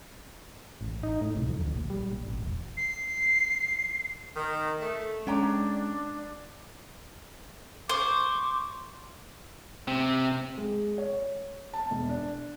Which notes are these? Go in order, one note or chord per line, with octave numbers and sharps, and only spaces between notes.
A1
D#4
A2
C2
F2
D2
A#1
G3
A#1
A1
E1
C7
D#3
A3
G#3 C#4 D4 G5 A#5
C5 C#6 D6
C3 C4
G#3
C#5
A5
E1
D4